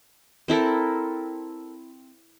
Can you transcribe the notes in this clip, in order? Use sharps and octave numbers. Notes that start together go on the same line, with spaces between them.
C4 E4 A4 A#4